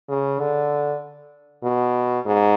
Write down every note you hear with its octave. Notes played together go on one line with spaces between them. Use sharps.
C#3
D3
B2
G#2